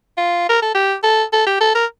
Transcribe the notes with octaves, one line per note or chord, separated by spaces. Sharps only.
F4
A#4
A4
G4
A4
A4
G4
A4
A#4